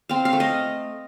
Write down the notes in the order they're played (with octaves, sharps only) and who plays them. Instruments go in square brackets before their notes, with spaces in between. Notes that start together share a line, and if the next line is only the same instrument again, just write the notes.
[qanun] C4 F5
F5
A3
D#5